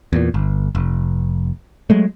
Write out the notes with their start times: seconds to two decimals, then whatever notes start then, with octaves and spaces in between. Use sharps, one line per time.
0.13 E2 A#2
0.34 G1
0.75 F1
1.90 F#3 G#3 A3